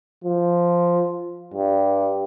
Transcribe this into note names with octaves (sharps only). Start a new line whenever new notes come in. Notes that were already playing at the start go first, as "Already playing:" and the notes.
F3
G2